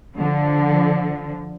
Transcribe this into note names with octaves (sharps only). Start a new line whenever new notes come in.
D3 F3